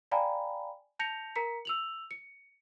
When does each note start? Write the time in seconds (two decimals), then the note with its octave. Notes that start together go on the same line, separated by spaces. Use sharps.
0.11 D5 F5 G5 G#5 A#5 B5
0.99 A5 G6 A#6 C#7 F7
1.36 A#4 A#5 B6 C#7
1.65 E6 F7 F#7
2.11 C#7